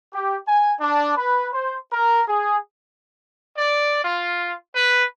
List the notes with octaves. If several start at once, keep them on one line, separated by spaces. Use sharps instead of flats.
G4
G#5
D4
B4
C5
A#4
G#4
D5
F4
B4